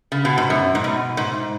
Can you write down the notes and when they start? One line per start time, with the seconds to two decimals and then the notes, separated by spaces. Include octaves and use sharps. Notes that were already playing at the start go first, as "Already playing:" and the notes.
0.12 C#3
0.25 B2
0.38 G#2
0.50 F#2
0.75 G#2
0.84 B2
1.17 G#2